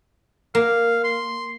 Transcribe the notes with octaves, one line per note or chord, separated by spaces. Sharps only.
A#3 F5
C6